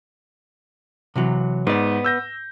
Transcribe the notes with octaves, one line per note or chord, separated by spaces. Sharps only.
C3 E3 F#3
G#2 B3 D5
E6 G6 A#6